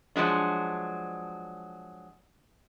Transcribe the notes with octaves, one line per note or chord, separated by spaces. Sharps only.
F3 F#3 G#3 D4